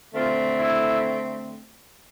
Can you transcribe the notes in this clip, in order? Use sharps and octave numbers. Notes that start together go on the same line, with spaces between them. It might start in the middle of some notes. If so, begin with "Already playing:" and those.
D3 A3 C4 F4
E4